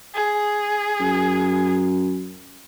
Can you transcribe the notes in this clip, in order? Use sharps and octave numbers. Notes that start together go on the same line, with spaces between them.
G#4
F#2